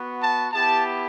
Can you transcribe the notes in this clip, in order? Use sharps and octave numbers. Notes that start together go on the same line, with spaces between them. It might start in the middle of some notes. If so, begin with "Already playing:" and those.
Already playing: B3 F#4
A5
B3 E4 G4 A5